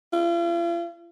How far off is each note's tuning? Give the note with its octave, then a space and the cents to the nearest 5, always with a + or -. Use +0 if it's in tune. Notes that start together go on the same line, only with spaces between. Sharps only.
F4 -45